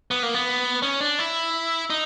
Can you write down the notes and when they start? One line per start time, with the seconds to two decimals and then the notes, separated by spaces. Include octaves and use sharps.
0.11 B3
0.23 A#3
0.34 B3
0.83 C#4
1.01 D4
1.19 E4
1.90 D#4